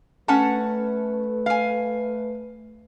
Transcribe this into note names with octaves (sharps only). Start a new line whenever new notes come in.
A3 C#4 B4 F#5 A5
F5 G#5